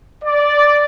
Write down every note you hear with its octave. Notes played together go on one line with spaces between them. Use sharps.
D5